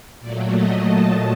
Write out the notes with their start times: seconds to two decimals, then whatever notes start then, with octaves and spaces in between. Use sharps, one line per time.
0.20 A#2 F#3 A3 D5
0.52 D#5
0.83 A5